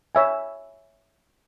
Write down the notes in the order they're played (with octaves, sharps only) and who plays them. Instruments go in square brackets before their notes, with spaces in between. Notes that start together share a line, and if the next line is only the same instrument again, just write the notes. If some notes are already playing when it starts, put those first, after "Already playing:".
[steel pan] C#5 E5 G#5